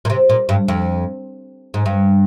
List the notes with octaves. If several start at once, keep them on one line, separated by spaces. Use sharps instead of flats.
A#2
C3
A#2
G2
F2
G#2
G2